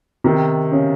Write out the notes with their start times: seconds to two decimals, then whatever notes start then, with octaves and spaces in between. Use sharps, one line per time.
0.24 C3 D#3
0.72 C#3